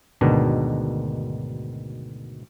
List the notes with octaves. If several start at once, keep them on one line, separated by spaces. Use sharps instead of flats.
D2 G#2 B2 D#3 D4